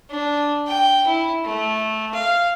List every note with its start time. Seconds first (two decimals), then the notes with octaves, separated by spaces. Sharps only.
0.11 D4
0.67 G5
1.07 E4
1.45 A3
2.14 F5